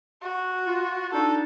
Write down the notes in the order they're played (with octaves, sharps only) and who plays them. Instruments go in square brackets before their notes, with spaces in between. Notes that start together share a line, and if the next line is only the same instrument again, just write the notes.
[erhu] F#4
[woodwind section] F4
[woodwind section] D4 D#4 [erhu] A4